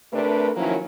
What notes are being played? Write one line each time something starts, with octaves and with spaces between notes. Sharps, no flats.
C3 A3 D4 A#4 B4
D#3 F3 F#3 A#3 C#4 E4